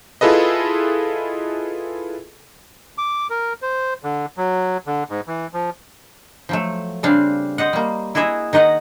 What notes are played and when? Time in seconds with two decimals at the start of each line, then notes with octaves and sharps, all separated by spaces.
0.21 E4 F4 G#4 A4 B4 D#5
2.98 D6
3.30 A#4
3.62 C5
4.03 D3
4.37 F#3
4.87 D3
5.09 G#2
5.27 E3
5.53 F3
6.49 F3 F#3 A3
7.03 C#3 G3 C4 D4 F5
7.58 C5 D#5 F#5
7.73 G3 A#3
8.15 E4 F#4 G#4 D#5 E5
8.53 D#3 D#4 D#5 F#5